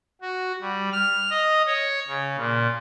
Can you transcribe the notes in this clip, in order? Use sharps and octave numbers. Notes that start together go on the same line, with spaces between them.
F#4
G3
F6
D#5
C#5
C#3
A#2